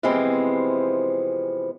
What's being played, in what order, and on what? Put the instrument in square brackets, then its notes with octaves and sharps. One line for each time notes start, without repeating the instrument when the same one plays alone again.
[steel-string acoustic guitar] C3 E3 F3 G#3 B3 C4